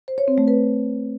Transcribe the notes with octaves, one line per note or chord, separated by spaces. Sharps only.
C5
C#5
C4
A3
B4